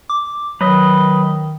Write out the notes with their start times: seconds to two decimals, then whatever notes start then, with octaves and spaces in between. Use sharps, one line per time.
0.10 D6
0.61 D#3 F#3 B4 D#5